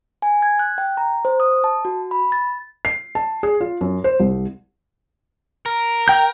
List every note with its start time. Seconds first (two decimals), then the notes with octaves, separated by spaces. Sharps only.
0.22 G#5
0.42 G#6
0.59 F#6
0.78 G5
0.97 A#5
1.25 C5
1.40 D#6
1.64 A5
1.85 F#4
2.11 B5
2.32 A6
2.85 C7
3.15 A5
3.43 G#4
3.61 F4
3.81 F#2
4.04 C5
4.20 C2
5.66 A#4
6.08 G5 G6